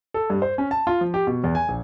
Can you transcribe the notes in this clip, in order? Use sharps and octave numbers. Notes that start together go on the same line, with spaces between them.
A4
G2
C5
C#4
A5
F4
F3
G4
B2
E2
G#5
A#1